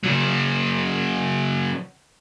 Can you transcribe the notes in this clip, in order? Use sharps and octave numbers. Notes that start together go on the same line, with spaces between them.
C#3 F#3